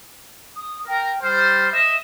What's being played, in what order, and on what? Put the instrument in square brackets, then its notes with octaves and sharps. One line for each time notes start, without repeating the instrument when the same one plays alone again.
[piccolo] D#6
[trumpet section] A#4 [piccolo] G5
[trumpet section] G3 C5 [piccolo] F6
[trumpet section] D#5 E5 [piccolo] E7